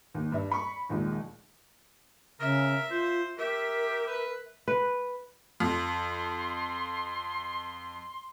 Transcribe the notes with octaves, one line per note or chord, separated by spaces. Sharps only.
D#2
G2 E5
B5 C#6
A#1 D#2 G#3
C#3 A#4 E5
F4 C5
G4 A#4 E5
B4
B4
F2 C6